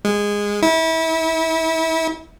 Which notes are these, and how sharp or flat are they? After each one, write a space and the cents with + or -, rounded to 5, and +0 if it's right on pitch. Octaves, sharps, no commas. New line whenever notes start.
G#3 -15
E4 -30